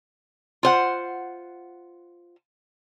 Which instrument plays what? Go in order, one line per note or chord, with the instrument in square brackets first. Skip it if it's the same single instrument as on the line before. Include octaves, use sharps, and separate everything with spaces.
[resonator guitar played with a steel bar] F4 C5 F#5